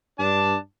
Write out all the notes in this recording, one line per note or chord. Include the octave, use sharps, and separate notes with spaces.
G2 D4 A5 D6